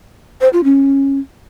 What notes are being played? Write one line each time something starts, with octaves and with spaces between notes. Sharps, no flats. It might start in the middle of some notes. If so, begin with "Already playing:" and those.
C5
F4
C#4